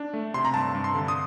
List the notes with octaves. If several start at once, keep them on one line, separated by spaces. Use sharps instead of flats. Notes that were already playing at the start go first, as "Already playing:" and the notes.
Already playing: D4
A3
C3 C6
A#5
G2 A5
G2
C6
D3
D#6